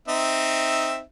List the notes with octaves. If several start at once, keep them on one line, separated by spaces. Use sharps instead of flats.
C4 D#4 E5